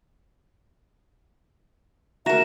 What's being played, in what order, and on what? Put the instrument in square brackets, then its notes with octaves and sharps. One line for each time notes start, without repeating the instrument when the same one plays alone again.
[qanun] F#4 A#4 [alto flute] E5 [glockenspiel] A#5 A#6 E7